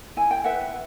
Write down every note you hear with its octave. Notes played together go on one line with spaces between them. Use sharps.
E4 G#5
G5
B4 E5 F#5